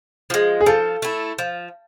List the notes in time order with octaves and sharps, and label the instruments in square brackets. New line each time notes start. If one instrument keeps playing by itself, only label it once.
[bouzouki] F3 G#3
[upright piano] G#4
[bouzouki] F3 [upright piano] A4
[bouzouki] A3 E4
F3